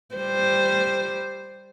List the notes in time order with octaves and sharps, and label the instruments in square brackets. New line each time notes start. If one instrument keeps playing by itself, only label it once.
[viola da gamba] G3 C5